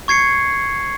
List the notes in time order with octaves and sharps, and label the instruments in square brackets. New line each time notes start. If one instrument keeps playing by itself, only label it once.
[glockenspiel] C#6 G#6 C7 C#7